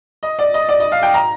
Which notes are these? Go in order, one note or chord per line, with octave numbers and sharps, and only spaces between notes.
D#5
D5
D#5
D5
D#5
F5
G5
A#5